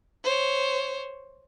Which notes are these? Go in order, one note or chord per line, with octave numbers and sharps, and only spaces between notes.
C5 C#5